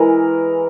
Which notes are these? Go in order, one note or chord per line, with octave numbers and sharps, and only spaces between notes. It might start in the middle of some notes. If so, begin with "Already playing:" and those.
Already playing: E3 G#3 A#4